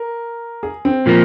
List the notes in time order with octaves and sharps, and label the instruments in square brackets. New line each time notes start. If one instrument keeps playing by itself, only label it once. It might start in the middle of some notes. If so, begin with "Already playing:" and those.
Already playing: [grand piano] A#4
G#4
C4
[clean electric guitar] A#2 F3 A#3